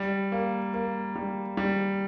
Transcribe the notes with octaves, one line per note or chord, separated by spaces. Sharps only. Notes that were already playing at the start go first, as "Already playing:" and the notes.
Already playing: G3
A#3
A#3
G3
G3